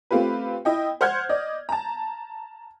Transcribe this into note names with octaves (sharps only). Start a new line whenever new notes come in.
A3 C4 F4 G4 B4
E4 D#5 G5
C5 F#5 F6 G6 G#6
D5 D#5
A5 A#5